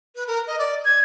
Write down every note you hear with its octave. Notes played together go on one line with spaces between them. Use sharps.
B4
A#4
D#5
D5
G#6